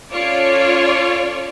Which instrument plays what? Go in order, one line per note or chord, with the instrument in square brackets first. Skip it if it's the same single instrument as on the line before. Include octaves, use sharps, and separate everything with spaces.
[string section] C#4 F4 A4 C#5 D5